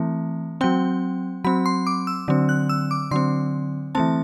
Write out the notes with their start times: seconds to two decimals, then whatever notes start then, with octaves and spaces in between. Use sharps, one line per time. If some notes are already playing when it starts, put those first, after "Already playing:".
Already playing: E3 A3 C4
0.61 F#3 C4 G5
1.44 F#3 C4 B5
1.66 C6
1.87 D6
2.07 E6
2.28 D3 F#3 C4
2.49 F#6
2.69 E6
2.91 D6
3.11 D3 F#3 C4 C6
3.95 E3 A3 C4 A5